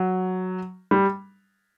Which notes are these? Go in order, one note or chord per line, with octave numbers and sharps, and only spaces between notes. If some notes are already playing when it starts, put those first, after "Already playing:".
Already playing: F#3
G3